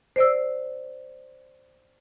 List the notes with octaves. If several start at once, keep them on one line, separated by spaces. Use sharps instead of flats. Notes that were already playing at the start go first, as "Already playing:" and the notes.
C5 D5 E6